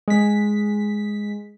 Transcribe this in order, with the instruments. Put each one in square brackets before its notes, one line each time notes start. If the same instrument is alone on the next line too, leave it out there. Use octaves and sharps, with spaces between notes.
[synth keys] G#3 B6